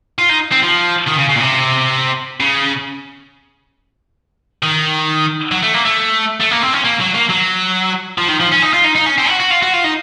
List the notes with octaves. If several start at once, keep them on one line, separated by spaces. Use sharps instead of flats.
F4
D#4
C4
F3
D#3
C#3
C#3
A#2
C3
C#3
D#3
F#3
A3
A#3
A3
A3
A#3
C4
C#4
A#3
F#3
A#3
F#3
F3
D#3
F3
C#4
D#4
F4
D#4
D#4
C#4
C4
F#4
F#4
F4
F#4
F4
D#4